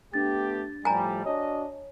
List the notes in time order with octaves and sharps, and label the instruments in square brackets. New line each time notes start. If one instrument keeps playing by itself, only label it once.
[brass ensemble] A3 B3 G4 [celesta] D4 A6
[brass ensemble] A2 F3 G3 [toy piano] G#5 A#5
[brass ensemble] D4 F#4 D#5 [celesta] C#5